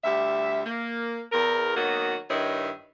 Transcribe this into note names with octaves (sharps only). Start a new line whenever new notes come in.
D2 G3 E5
A#3
E2 A#4
D#3 F#3 A#3 B3 F#4
G2 D#3 E4 C#5 D#5